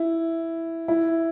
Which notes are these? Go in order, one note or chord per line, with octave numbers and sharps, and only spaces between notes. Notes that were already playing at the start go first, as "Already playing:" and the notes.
Already playing: E4
E4